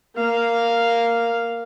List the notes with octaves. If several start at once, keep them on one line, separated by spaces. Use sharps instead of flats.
A#3 F5